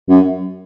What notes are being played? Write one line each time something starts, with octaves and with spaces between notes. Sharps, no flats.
F#2